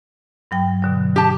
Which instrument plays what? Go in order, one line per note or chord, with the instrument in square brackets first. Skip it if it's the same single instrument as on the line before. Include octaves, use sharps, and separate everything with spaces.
[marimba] G2 F#3 G5
B2 D3 F#3
[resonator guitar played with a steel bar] G4 A5